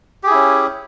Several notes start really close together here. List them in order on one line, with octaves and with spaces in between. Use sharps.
G4 G#4 E4 C#4